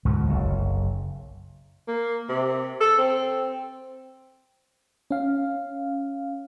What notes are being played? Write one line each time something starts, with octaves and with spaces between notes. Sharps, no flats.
D2 G#2 B2 F3
F#1 B1
A#3
C3
A4
C4
C#4 F5